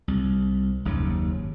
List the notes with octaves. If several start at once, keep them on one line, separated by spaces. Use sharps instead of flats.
C2
F#1 D#2 G#2 C#3